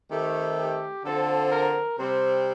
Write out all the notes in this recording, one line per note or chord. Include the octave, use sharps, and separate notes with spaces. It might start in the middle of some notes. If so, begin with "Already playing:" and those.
D#3 A3 C4 G4
G4
D3 F3 C4 A4
A#4
C3 G3 C4 C5